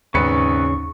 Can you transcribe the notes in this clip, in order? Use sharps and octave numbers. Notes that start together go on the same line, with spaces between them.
G#1 D#2 C#3 B4 C#6 C#7